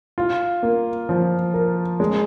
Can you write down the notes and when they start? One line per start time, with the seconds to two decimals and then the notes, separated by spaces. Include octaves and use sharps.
0.18 F4
0.63 A#3
1.09 F3
1.54 A#4
2.00 G#3